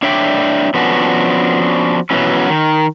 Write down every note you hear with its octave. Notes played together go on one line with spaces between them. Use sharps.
D4 C#5 D5 E5 G5
F3 B3 C#4 D4 F#4
B2 E3 F#3 C#4
D#3